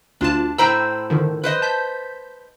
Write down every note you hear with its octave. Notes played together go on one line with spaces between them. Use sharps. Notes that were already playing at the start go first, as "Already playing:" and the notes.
D2 D4 F4 A5
A2 C5 G5 A#5 B5 E6
D3 D#3 F3
B4 C5 D#5
A5 G6 B6